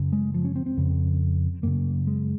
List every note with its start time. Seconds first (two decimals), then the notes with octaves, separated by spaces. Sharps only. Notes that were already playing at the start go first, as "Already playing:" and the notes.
Already playing: F#2 C#3
0.12 G#3
0.34 F3
0.45 C#4
0.56 C4
0.66 C4
0.77 F2 C#3
1.63 F#2 C#3 A#3
2.07 G#3